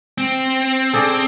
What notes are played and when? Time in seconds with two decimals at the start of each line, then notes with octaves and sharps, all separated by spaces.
0.18 C4
0.93 D4 G#4 A4